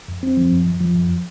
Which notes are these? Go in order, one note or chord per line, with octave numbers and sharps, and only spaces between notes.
F2
C4
F3
F2
F2
F3
F2